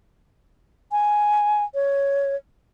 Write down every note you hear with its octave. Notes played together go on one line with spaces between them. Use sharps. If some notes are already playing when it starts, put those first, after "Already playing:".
G#5
C#5